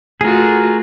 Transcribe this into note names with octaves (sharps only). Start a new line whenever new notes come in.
A3 F4 F#4 G#4 A#4